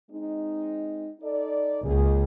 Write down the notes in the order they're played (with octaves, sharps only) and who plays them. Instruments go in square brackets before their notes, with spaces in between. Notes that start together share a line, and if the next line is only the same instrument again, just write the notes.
[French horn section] G#3 C4 D#4
D#4 A4 D5
[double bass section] C#2 [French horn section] A#3 G#4